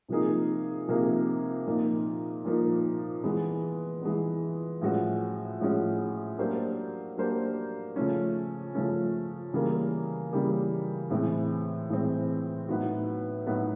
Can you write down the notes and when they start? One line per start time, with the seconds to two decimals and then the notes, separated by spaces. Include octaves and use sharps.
0.08 C3 F3 A#3 D#4 G#4
0.88 C3 F3 A#3 D#4 G#4
1.67 A#2 F3 A#3 D#4
2.45 A#2 F3 A#3 D#4
3.24 E3 G#3 B3
4.02 E3 G#3 B3
4.81 A2 F3 G#3 C#4 F#4
5.60 A2 F3 G#3 C#4 F#4
6.38 F#3 A#3 D4 G4 C5
7.17 F#3 A#3 D4 G4 C5
7.96 C#3 F3 A3 C#4
8.75 C#3 F3 A3 C#4
9.53 C#3 E3 G3 A#3
10.31 C#3 E3 G3 A#3
11.10 A2 E3 G#3 C4
11.90 A2 E3 G#3 C4
12.68 A2 F#3 B3 D#4 F#4
13.47 A2 F#3 B3 D#4 F#4